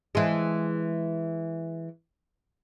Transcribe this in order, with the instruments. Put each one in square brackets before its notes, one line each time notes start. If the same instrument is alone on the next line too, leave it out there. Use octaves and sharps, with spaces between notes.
[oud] E3 G#3